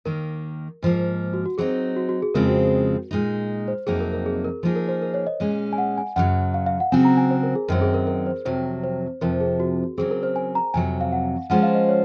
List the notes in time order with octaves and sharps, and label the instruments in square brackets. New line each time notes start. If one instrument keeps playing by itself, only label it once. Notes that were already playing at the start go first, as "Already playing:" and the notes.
[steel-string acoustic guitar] D#2 D#3 A#3 [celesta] A#4
[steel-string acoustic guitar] G#2 F3 A#3
[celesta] F#4
F#4
[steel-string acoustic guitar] F#3 C4 D#4 [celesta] G#4
[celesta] F#4
F#4
G#4
[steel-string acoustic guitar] F2 C#3 G#3 C4 F4 [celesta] A#4
[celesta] F#4
[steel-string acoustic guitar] A#2 G#3 D#4
[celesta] C5
[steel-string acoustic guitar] F2 C3 F#3 A#3 D#4 [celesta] G#4
[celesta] A#4
A#4
G#4
A#4
[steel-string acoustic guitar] F3 A#3 D#4 G#4
[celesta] A#4
C5
A#4
C#5
D#5
[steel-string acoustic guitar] A#2 G#3 C#4
[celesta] G#5
F#5
G#5
[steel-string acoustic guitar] F#2 C#3 F#3 [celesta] F#5
[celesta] F5
F5
F#5
[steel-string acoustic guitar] C#3 F#3 C4 F#4 [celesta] G#5
[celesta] A#5
G#5
C5
A#4
G#4
[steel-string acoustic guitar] F#2 D#3 F#3 C4 [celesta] A#4
[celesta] G#4
A#4
A#4
C5
[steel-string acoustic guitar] F2 C3 F#3 [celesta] C5
[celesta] C5
[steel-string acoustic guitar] F2 C3 F3 [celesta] A#4
[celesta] G#4
F#4
[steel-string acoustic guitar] C#3 F#3 C4 [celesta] G#4
[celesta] A#4
C5
G#5
A#5
[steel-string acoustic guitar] F2 C3 F#3 [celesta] G#5
[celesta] F5
F#5
[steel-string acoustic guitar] F3 G#3 C#4 F4 C5 [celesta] F#5
[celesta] F5
D#5
C#5